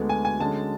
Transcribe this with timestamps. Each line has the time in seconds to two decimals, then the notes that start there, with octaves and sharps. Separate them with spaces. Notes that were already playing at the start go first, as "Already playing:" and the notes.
Already playing: D2 D3 G#3 B3
0.09 G#5
0.25 G#5
0.40 D3 G#3 C#4 A5